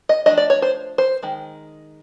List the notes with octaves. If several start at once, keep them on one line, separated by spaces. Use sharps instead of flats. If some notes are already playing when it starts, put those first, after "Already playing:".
D#5
F3 A3 D4 D#5
D5
C#5
C5
C5
D#3 G#3